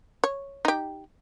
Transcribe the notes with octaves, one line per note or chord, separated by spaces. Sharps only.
C#5
D#4 G4